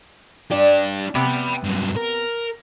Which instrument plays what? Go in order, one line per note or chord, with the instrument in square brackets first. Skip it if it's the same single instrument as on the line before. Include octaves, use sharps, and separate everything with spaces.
[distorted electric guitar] D4 G4 [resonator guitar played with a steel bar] D5
[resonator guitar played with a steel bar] C3 B3 [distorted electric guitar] G5 B5
[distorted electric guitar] G2 F#3
A#4